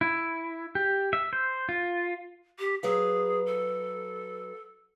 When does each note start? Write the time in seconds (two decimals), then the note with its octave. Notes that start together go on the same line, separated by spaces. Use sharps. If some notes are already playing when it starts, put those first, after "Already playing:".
0.01 E4
0.75 G4
1.13 E5
1.33 C5
1.69 F4
2.59 G4
2.83 F#3 G#4 B4 F5
3.46 A4